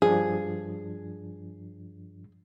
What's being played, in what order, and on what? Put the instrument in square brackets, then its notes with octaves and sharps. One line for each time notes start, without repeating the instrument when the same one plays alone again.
[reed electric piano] G2 F3 D4 [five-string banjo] G#4